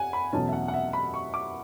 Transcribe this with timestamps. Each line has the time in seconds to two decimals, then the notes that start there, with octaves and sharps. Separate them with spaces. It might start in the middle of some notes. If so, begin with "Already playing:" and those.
Already playing: F#5 G#5
0.13 B5
0.33 E2 B2 F#3 A3 C#4 A5
0.48 E5
0.53 F#5
0.68 F#5
0.74 E5
0.93 B5
1.14 C#6
1.34 D6